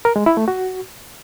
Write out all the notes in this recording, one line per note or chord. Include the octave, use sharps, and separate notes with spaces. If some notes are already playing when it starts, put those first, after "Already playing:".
A#4
G#3
E4
A3
F#4